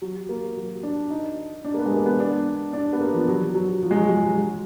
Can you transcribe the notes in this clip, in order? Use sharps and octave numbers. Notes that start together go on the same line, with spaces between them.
F#3
A#3
F#3
D4
D#4
D4
A#3
B3
G#3
A#3
B3
D4
D4
B3
A#3
F3
F#3
F#3
F3
G#3
F#3
G#3
F#3